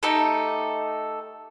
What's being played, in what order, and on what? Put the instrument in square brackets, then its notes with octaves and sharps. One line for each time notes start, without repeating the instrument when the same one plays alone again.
[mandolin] A3 D#4 G4 A4